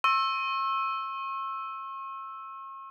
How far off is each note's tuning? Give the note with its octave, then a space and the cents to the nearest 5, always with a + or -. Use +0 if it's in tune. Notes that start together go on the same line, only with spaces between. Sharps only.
C#6 -45 E6 +0